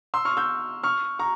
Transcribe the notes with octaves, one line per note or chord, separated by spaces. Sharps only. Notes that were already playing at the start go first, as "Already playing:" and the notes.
C6 E6
C#6 F6
E6 G6
C#6 F6
A#5 C#6